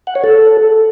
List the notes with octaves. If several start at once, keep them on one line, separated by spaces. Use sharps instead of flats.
F#5
C#5
A4